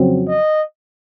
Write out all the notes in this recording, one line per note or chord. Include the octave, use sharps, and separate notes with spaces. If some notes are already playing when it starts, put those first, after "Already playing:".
Already playing: F2 C#3 F#3 C4
D#5